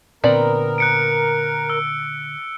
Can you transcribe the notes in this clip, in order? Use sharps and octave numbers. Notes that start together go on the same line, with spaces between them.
A#2 D3 B3 C4 A#4 D5
F#6 C#7 D7
E6